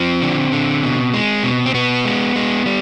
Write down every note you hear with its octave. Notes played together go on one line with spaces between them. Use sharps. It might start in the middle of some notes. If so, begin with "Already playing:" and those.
Already playing: F3 C4
D3
D3
B2
G#3
B2
C4
B2 B3
G#3
G#3
G3